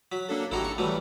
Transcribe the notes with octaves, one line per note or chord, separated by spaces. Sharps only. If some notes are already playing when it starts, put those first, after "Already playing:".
F#3 B6
A#3 D4 A4
G#1 E4 F#4 G4 A4 A#5
C#6
E3 F#3 G3 A3